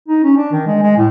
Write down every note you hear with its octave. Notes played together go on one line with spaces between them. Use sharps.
D#4
C#4
D4
D#3
G#3
G#3
A2